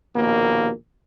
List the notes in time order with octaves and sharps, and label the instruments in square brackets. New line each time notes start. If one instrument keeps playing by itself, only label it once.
[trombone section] A#1 D#2 B2 A#3